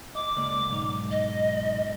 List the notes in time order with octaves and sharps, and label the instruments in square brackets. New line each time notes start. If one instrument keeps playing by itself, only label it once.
[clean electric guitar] D#5 [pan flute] D6
[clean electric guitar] C#2 A#3 D5
B1 G#2 D#4
[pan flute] D#5